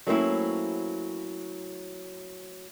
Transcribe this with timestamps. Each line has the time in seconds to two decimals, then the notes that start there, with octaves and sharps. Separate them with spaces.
0.07 F#3 A3 A#3 C4 C#4 E4